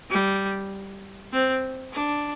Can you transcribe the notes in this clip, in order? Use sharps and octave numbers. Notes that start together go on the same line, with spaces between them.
G3
C4
D4